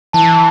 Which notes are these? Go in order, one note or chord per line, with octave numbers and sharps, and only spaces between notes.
E3 A5